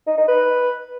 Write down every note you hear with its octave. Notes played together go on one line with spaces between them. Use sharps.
D#4
D#4
B4